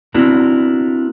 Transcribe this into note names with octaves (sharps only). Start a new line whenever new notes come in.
B3 C4 D4 E4 F#4 A#4